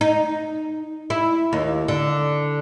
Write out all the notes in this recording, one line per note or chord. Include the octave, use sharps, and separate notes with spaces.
D#4
E4
D#2
D3